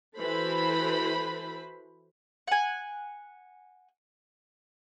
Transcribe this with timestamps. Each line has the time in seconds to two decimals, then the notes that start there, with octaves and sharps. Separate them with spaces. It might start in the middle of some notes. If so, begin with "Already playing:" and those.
0.17 E3 F#4 A4 B4 C5 B5
2.48 F#5 G#5